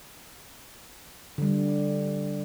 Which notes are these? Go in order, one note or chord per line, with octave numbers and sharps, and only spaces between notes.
D3 G3